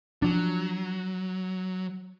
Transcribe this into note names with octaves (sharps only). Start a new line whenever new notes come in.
F3 F#3 D4